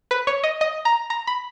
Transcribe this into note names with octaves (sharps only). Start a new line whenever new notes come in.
B4
C#5
D#5
D#5
A#5
A#5
B5